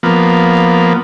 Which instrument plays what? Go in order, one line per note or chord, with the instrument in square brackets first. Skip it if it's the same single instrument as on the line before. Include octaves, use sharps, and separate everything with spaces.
[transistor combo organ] F3 A#3 B3